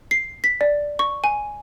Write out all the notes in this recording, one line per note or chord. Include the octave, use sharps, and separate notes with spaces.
C7
B6
D5
C#6
G#5